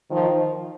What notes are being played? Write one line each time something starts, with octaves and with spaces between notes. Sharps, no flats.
D#3 F3